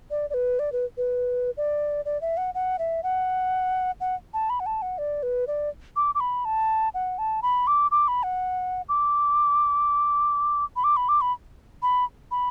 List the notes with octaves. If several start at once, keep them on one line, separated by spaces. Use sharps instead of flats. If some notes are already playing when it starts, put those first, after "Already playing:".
D5
D5
B4
D5
B4
B4
D5
D5
E5
F#5
F#5
E5
F#5
F#5
A5
B5
F#5
A5
F#5
D5
B4
D5
D6
D6
B5
A5
F#5
A5
B5
D6
D6
B5
F#5
D6
B5
D6
B5
D6
B5
B5
B5